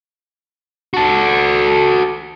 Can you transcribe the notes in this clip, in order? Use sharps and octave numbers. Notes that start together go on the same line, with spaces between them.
F#4 A4